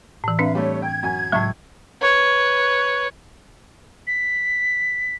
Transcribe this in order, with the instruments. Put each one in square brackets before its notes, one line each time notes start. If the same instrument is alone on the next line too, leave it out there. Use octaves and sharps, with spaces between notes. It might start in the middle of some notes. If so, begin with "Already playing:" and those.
[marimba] A2 E3
[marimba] C4 D4 [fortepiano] B4 [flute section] E5 F5
[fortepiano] G3 A3 [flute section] C#5
[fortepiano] G5 [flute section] G#6
[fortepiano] F#2 G#5
[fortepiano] C#2 E5 C#6 [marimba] A2 F#3
[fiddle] B4 C#5
[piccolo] B6